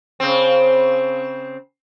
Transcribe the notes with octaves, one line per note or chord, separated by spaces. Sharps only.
C#3 C4